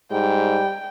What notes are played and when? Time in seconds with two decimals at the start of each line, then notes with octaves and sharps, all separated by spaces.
0.12 G#2 G3 G5